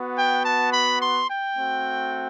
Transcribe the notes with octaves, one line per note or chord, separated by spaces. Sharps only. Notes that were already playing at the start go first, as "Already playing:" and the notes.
Already playing: B3 F#4
G5
A5
B5
C6
G5
A3 C4 F#4